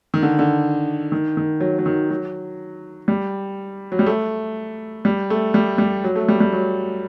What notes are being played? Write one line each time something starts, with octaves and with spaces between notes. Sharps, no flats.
D#3
D3
D3
D#3
D#3
F#3
F#3
D#3
F#3
G3
F#3
G3
A3
G3
A3
G3
G3
F#3
A3
G3
G3
F#3